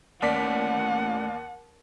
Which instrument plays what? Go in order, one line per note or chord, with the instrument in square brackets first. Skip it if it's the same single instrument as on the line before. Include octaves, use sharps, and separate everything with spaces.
[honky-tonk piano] D#2 D5 B6 [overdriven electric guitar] A2 C#4 [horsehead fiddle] F#5